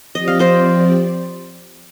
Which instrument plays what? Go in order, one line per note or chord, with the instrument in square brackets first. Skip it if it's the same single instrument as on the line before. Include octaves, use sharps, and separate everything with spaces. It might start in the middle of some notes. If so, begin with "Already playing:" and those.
[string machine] F3 C4 G4 D5 [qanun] D#5
[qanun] F5
C5 D#5